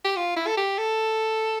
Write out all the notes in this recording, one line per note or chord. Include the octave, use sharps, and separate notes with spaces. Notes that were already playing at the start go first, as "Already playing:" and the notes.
G4
F4
E4
A4
G4
A4